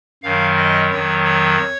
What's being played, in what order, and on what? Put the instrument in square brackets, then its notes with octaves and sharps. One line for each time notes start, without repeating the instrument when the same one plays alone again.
[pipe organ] F#2 D#3 F#3 F5
D#5
F2 D#3 F#3 C#5
C#5